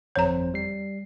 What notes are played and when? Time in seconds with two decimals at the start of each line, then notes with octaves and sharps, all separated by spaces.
0.16 G1 F2 C5 C#5 A#5
0.54 G3 C7